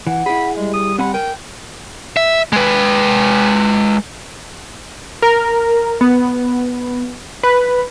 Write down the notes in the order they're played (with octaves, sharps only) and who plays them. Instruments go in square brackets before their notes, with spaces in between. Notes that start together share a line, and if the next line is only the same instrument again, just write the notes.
[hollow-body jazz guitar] E3 [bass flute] F#5
[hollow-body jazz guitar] E4 G#4 [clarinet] B5
[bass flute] G3 [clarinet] G#3
[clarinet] D#6
[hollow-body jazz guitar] C4 G#5 B5 [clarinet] F#5
[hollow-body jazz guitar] A#4 G#5 [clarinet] G5
[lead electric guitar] E5
G#3 B4
[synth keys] A#4
B3
B4